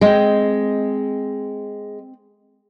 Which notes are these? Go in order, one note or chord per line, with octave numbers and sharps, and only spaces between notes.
G#3 C4 D#5 G5